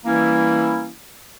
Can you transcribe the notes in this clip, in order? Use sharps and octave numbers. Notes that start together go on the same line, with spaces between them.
E3 G3 A#3 C#4 E4